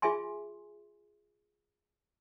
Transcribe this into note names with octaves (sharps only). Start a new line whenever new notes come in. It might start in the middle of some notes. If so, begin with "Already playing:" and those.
F4 G#4 E5 G#5 C6